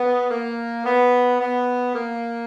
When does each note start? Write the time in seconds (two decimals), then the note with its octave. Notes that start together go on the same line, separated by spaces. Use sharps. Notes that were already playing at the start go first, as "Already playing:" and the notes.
Already playing: B3
0.31 A#3
0.85 B3
1.40 B3
1.95 A#3